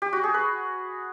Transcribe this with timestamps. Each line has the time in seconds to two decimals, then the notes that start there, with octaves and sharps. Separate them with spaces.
0.02 G4
0.13 F#4
0.23 G#4
0.34 B4